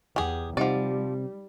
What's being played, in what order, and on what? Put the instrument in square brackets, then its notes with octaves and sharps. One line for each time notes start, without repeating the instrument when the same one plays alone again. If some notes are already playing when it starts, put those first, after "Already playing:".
[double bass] E2 [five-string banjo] G4 G#4 [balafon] F#5 G#5
[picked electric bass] C3 [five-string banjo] F3 D5 [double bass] G3 [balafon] D#4 D#5 F#5